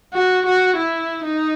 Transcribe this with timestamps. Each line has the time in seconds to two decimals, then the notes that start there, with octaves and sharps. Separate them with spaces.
0.14 F#4
0.46 F#4
0.77 E4
1.24 D#4